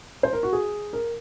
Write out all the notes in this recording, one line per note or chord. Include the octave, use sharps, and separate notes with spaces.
C5
A#4
F#4
G#4
A#4